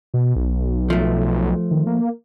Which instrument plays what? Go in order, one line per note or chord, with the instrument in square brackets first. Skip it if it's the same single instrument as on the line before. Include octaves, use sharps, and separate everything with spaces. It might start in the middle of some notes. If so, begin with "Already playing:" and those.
[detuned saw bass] B2
B1
[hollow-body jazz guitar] F3 A3
[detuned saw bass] D#3
A#3